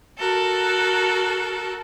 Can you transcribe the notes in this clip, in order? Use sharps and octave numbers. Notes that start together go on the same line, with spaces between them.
F#4 A4 A#4